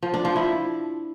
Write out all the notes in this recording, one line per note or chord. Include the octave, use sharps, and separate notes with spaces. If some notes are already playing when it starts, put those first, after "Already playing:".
F3
D4
F3
E4